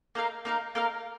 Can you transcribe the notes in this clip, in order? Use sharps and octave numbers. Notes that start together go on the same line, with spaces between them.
A#3 D#4 A#4 F5
A#3 D#4 A#4 F5
A#3 D#4 A#4 F5